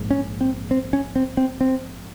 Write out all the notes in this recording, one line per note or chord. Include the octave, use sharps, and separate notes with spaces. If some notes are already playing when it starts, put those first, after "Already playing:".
Already playing: A#1 G#2
C#4
C4
C4
C#4
C4
C4
C4